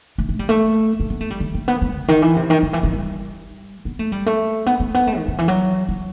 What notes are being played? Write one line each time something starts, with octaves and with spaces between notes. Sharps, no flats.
A3
A3
G3
A3
A3
B3
A3
G3
D#3
A3
B3
A3
C3
D#3
E3
C3
D#3
D#3
E3
E3
G3
B3
A3
G3
A3
B3
A3
B3
A3
D#3
D#3
E3
F#3
F#3